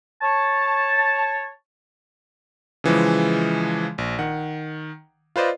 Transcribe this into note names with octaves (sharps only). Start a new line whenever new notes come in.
C#5 A5
C#3 E3 F3 G#3
A#1
D#3 F#5
F4 B4 C5 D5 D#5